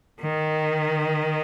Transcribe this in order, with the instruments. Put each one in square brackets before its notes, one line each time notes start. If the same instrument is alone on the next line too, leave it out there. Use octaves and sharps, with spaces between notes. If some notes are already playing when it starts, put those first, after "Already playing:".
[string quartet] D#3